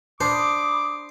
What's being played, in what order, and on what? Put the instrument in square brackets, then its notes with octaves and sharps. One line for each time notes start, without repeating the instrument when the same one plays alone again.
[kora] D4 [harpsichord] C5 [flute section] B5 D#6 [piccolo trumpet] D6